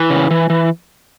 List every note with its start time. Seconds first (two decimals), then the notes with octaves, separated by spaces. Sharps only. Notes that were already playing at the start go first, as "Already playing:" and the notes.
Already playing: E3
0.10 C#3
0.31 E3
0.50 E3